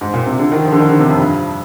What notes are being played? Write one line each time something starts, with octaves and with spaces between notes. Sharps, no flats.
G#2
A#2
C3
D3
D#3
F3
D3
D#3
D3
C3
F2
G2